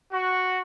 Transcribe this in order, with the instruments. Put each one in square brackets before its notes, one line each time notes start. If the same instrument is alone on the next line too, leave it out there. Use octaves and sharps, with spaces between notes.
[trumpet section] F#4